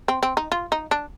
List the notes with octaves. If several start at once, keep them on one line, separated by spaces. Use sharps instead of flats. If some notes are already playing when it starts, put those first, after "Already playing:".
C4
C4
D#4
F4
D#4
D4